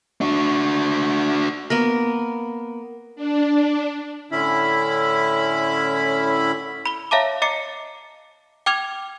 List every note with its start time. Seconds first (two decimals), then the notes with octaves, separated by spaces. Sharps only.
0.21 D4 F#4
1.70 A#3 B3 A#4
3.15 D4
4.32 A2 D3 C#4 E4 E5 B5
6.86 B5 G7
7.11 C#5 E5 F5 A5 A#5 D6
7.42 D#5 A#5 D6 C7 C#7
8.66 G5 D6 F6 G#6 F7